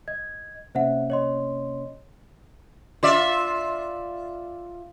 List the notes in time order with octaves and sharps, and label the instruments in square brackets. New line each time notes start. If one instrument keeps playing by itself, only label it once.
[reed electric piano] D#5 [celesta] G#6
[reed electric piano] C3 A#3 C#4 [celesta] C5 E5 F#5
[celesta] C#5 D#5 C6
[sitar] F4 D5 E5